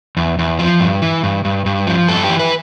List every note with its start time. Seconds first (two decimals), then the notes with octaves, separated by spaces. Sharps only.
0.17 E2
0.39 E2
0.59 F3
0.80 G2
1.02 E3
1.23 G2
1.45 G2
1.66 G2
1.87 F3
2.08 G2 A4
2.24 G4
2.30 E3
2.39 B4